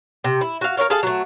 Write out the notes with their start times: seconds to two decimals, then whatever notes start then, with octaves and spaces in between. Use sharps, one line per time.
0.24 C3
0.41 E4
0.61 F#4 F5
0.77 A#4 B4 C#5 F5
0.90 G#4 A4 F5 A5
1.03 F#3 A3